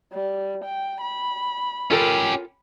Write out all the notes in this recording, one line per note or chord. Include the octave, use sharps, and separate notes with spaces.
G3
G5
B5
C#4 F4 G4 A4 A#4